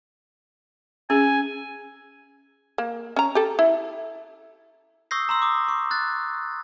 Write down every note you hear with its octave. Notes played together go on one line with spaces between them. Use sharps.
C#4 G#4 G#5
A#3
C#4 A#5
G4 A4
E4
C#6 D#6 E6 G6 A#6 C7
A#5 C6 E6
D6 D#6
C#6
F#6 A6